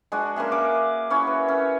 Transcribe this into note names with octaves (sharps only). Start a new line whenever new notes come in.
G#3 D4 F#4
A#3 C#4 G#4 E5
F#5 D6
C#4 E4 F#4 C#5
B4
C#4